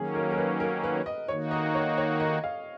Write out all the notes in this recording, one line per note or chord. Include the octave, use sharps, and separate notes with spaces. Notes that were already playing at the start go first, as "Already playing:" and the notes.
Already playing: D#3 F#3 A#3 C#4 G#4
A#4
A#4
B4
A#4
B4
D#5
D#3 A#3 D#4 F#4 C#5
D#5
C#5
C#5
D#5
F5